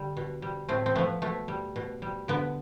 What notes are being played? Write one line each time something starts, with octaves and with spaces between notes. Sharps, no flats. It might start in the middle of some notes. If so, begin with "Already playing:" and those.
Already playing: D3 G3
B2
G3
A2 A3 C4
C4
F3 A3 B3
B2 A3
G3
B2
G3
D3 B3